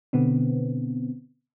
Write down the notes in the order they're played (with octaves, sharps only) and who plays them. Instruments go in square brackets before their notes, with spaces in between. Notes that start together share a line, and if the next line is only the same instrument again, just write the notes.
[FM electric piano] B2 D3 B3 C4